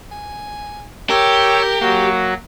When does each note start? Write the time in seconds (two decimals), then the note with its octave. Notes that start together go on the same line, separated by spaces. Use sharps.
0.12 G#5
1.10 G4 A#4 C#5 G5 E6
1.81 F#3 A#3 F#4